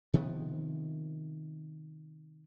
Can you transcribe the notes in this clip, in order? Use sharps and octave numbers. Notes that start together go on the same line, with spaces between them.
C3 D#3 F3 B3